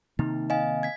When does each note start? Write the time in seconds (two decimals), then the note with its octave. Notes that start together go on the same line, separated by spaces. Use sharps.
0.19 C3 D#3 A#3 D#4
0.50 D#5 F5 G#5
0.83 G#6 B6